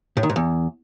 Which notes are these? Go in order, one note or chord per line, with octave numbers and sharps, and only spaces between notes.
A2
D#3
G#2
E2